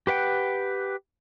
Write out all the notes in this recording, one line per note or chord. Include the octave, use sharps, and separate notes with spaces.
G4 B4 F#5 G5